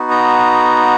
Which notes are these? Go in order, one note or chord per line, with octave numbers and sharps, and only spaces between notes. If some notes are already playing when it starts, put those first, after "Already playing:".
Already playing: B3 D#4 F#4
A#5